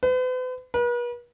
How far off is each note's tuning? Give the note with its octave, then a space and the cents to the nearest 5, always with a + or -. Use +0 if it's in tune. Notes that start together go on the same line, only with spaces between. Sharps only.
B4 +45
B4 -40